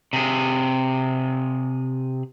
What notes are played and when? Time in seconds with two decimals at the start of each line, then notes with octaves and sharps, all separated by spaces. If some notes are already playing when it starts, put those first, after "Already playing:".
0.13 C3 G#4